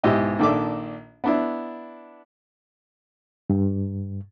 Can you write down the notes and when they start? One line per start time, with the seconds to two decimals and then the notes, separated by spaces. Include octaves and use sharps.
0.03 B1 G#2 E4 G4 D#5 E6
0.39 A#1 D#3 D4 A4 E5 D6
1.24 B3 D4 E4
3.50 G2